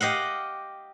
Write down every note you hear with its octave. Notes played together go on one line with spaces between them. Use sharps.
G4 D#5 F5 F#5